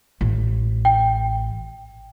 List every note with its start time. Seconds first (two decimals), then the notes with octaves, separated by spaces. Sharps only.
0.21 A1
0.85 G5